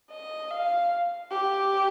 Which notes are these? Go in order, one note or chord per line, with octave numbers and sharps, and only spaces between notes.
D#5
F5
G4